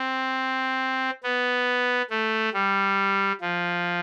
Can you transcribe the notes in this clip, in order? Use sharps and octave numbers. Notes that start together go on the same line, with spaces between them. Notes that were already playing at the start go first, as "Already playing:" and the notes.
Already playing: C4
B3
A3
G3
F3